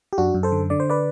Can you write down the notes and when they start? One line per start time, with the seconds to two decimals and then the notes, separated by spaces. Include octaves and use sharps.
0.13 G4
0.18 F#2 D4 F#4
0.34 F#2
0.43 A4 C5
0.52 D3
0.70 D3 D5
0.80 C5
0.90 B4 D5